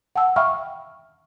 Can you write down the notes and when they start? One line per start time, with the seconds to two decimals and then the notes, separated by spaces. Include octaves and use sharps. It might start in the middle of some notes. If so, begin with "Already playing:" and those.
0.16 F#5 G5 A5 E6
0.36 E5 F5 G5 B5 C#6 F6